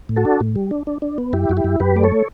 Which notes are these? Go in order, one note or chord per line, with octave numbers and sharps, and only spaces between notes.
A2
F#4 A4
D4
A2
G3
D4
D4
D4
B3
F#2 E4 G4
F#2 F#4
E4 G4
F#2
F#2 G4 B4
A3 D5
A4 C#5
A3